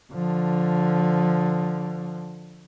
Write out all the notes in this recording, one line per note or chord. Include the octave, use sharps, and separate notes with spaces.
D3 F3